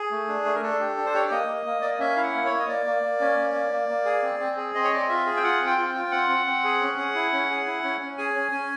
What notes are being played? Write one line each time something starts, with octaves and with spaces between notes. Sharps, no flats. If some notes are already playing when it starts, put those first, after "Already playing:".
Already playing: G#4
A3
D4
A3
A#4
D4 A4
G4
D4
C5
G4 C#5
D5
A#3 D#5
A#3
A#3
A#3 D5
D#5
C#4 E5
E4 F5
F#5
A#3
C#5
A#3
D#5
A#3 D5
A#3
A#3
C#4
A#3
A#3
A#3
A#3
G#4
C4
C4
G#4
C4 D#5
C#5
C4 D5
D#5
F4 E5
G#4
G5
F4 F#5
C4
G5
F4
G5
F4
G5
C4 F#5
C4
C4
G#4
C#4
G#4
E4
C#4
G#4
E4
C#4
C#4
G#4 G#5
C#4
C#4